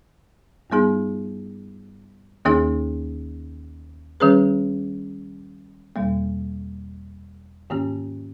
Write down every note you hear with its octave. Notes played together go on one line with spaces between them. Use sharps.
G2 G3 B3 D#4 G#4
D#2 D#3 A#3 D#4 G#4
D#3 G3 C#4 G#4 B4
E2 B2 G3 A#3
G#2 D#3 A#3 C#4 G4